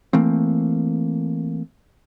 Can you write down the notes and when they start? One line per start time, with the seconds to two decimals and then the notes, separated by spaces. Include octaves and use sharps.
0.13 E3 A3 A#3 C4